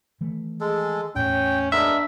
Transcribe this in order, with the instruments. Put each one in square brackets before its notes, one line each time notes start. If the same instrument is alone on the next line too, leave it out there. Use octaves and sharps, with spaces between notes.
[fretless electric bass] D#3 E3 A3
[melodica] G#3 A4 [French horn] G#4
[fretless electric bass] E2 A2 [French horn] C#4 [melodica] G5
[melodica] G#3 B3 A#4 [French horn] D4 [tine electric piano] E5